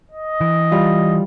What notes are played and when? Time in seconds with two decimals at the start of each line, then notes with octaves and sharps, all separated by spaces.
0.12 D#5
0.41 E3
0.72 G3 F4